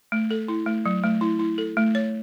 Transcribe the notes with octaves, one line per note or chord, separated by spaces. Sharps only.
A3
A4
E4
A3
F#3
A3
E4
E4
A4
A3
C#5